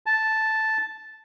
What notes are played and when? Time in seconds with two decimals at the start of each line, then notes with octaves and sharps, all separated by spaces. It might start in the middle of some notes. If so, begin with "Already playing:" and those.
0.06 A5